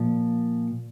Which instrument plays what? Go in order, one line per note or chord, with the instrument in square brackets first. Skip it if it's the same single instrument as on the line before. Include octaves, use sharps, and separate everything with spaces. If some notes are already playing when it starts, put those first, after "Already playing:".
Already playing: [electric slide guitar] A#2 F3